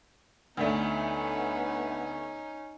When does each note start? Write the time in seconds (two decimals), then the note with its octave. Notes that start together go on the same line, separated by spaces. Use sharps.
0.57 D2 A3 B3 C#4 D#4